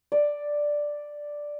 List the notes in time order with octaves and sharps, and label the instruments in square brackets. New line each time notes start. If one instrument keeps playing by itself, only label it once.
[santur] D5